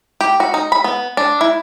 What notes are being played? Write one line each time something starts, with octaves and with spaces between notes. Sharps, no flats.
G4
F#4
D#4
B5
B3
D4
E4